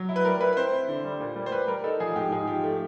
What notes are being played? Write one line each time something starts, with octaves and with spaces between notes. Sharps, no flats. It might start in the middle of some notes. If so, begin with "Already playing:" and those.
Already playing: F#3
E4
B4
G3 A#4
E4 B4
B4
C4 C5
E4
D3
G3
A#2
G3
C5
G3 B4
G3 A#4
D#4 A4
F3 G#4
G#2 G4
G#2 G#4
F3 G4
A3